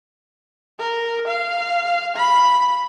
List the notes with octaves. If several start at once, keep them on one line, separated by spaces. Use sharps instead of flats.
A#4
F5
B5